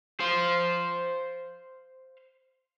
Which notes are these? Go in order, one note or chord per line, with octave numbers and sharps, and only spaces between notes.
C5 F5